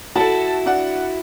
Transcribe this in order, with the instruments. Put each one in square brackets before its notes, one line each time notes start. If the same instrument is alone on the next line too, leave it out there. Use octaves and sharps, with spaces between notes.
[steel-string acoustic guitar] E4 F#4 [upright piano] A4 A5
[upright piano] D4 F#5